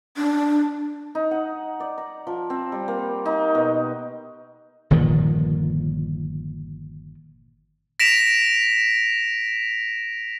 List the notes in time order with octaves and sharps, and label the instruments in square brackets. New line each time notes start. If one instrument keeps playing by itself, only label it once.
[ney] D4
[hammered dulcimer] D#4
F#5
D5
A#5
F3
C4
G3
A#3
D#4
B2
[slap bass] G1 A#2 D#3 F3
[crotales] A#6 B6 D7 E7 F7